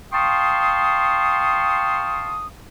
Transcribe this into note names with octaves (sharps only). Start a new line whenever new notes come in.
F5 G5 A5 C6 C#6 D#6